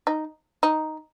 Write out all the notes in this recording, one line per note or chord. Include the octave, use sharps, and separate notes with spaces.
D#4
D#4